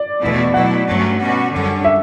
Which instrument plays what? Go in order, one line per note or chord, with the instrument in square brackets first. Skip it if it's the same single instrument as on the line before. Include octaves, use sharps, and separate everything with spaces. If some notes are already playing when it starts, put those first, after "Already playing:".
Already playing: [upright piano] D5
[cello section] E2 B2 A3 E4
[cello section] B2 F#3 A3 E4 [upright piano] F#5
[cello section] G2 F#3 A3 C#4
B2 G3 C#4 F#4
F#2 D3 G3 C#4
[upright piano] E5